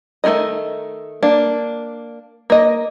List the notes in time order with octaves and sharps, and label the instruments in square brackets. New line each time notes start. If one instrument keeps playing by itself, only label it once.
[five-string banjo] D#3 A3 D4 A#4 D#5
A#3 D4
A#3 D#5